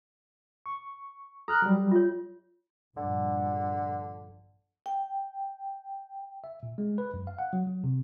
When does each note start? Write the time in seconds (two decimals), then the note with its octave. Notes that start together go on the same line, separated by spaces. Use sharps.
0.66 C#6
1.48 A4 A#5 F6 F#6
1.62 F#3 G3
1.92 F4 C#5
2.97 A#1 G2 D3
4.86 G5
6.44 E5
6.63 A#2
6.78 G#3
6.98 B4
7.14 F#2
7.27 F5
7.39 F#5
7.53 F#3
7.67 F#3
7.84 C3